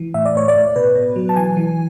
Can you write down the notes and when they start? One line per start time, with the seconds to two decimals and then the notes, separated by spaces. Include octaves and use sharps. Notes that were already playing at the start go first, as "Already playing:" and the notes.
Already playing: E3
0.14 A2 E5
0.25 D5
0.35 A2 C#5
0.48 D5
0.55 A2
0.76 B2 B4
0.95 B2
1.16 F#3
1.29 A5
1.36 E3 G#5
1.57 E3